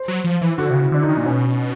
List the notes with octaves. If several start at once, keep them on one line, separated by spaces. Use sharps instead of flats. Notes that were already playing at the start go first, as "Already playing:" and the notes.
Already playing: C5
F#3
F3
E3
D3 F#4
C3
C#3
E4
D3 D4
D#4
D#3
A#2
B2 C#4